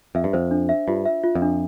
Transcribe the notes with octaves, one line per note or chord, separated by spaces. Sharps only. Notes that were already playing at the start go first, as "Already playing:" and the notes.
F2 E5
G2
F2 C5
D4
E5
G2 F4
E5
F4
F2
D4